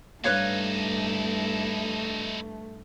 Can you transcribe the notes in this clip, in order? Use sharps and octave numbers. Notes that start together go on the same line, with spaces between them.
G2 A3 D#4 E4 B4 C#5 F5